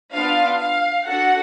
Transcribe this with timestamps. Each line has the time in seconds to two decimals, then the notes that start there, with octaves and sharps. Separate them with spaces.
0.12 B3 D4 F4 F5
0.59 F5
1.06 D4 F#4 A4 F#5